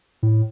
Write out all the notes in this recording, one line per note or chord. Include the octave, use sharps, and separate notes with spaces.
A2